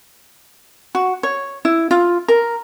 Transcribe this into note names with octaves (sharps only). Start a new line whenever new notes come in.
F#4
C#5
E4
F4
A#4